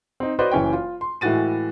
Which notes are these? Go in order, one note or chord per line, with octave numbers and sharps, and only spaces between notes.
C4 D#4
F#4 B4 C5 D5 D#5
F#1 E3 C#4 C#5 G5
F4
C6
A2 E3 G#3 F#4 A6 D#7